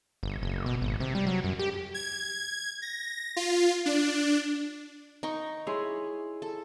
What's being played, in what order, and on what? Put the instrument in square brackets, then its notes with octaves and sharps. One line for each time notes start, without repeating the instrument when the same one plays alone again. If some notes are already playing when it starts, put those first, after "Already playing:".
[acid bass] G1
F#1
B2
G#1
C3
G3
F#3
F#2
G4
[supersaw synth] G#6
A#6
F4
D4
[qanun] D#4 G5 C#6
[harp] E4 G#4 C6 [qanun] C#5
[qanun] A4